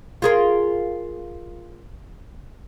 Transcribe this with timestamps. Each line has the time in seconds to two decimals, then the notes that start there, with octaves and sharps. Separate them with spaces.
0.22 F4 G#4 A#4